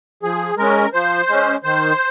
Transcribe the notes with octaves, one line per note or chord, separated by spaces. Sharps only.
F3 G#4
G#3 C#4 A#4
F3 C5
G#3 C#4
D#3 C5